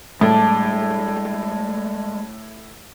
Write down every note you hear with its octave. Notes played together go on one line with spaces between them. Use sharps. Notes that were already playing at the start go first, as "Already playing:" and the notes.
A2 G3 G#3 D4